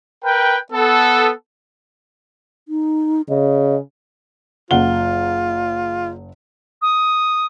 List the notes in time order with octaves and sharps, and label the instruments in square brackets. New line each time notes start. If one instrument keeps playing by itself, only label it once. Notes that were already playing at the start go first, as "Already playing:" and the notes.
[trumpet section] A#4 B4 G5
B3 A4
[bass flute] D#4
[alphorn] C#3 [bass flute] D#5
[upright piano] F#1 F#5 G7 [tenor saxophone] F4
[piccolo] D#6